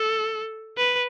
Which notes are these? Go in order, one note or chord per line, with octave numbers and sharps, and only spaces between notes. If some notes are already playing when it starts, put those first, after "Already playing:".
Already playing: A4
B4